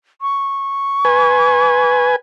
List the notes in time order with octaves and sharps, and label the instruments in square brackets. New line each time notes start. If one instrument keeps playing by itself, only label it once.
[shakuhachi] C#6
[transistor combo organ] B4 G#5